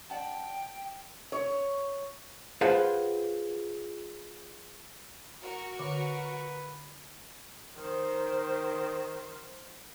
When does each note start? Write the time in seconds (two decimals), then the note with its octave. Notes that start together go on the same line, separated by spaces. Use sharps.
0.10 D5 F#5 G5 A5
1.32 C#5
2.61 F4 G#4 B4 C5 F#5
5.41 F#4 A#4 C#6
5.79 D3 B4
7.76 D#3 C5